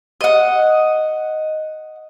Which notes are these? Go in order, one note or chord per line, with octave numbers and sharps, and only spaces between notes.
D#5 F#5